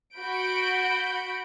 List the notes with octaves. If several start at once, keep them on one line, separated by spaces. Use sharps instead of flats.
F#4 B5 G6 D7